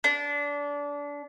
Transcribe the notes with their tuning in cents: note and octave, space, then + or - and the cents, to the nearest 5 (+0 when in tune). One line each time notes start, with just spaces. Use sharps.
D4 -25